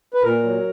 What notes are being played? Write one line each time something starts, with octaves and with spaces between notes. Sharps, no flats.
B4
A#2 A#4
F#3